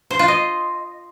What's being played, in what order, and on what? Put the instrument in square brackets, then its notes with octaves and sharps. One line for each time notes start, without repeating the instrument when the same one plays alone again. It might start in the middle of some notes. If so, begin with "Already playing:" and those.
[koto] C5
F4
D#5